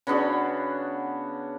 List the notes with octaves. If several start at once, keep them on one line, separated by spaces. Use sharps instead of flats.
C#3 B3 D4 F#4